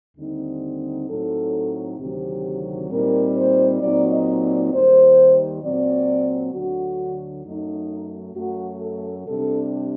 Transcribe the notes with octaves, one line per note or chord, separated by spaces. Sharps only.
D#2 D3 G3 C4 D#4
A2 F#3 C4 D#4 A4
D2 C3 D#3 F#3 C4 G4
A#2 G3 C4 D#4 A#4
C5
A#2 F#3 C4 D#4 D5
D#5
D5
D#2 D#3 G3 C5
A#2 F#3 C4 D5
D2 D3 F#3 F#4
F#2 F#3 A3 D#4
F#2 F#3 A3 F#4
A4
C3 G3 D4 A4